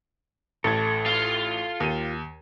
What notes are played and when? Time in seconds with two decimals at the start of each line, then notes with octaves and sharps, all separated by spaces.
0.64 A1 A2 A4 G#6
1.06 F4 F5
1.80 D#2 D#7